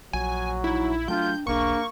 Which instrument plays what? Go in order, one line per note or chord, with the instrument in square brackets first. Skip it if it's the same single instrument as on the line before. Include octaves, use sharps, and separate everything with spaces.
[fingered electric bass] A#1 [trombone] F#3 [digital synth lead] G#5
[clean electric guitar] D#4 [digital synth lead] E4
[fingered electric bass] F#3 A3 [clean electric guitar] D4 D#5 G5 [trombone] F4 [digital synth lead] G6
[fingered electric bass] E1 B1 [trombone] A#3 [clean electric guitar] D4 G#4 [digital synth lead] C#6